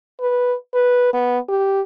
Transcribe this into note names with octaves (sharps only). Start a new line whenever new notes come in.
B4
B4
B3
G4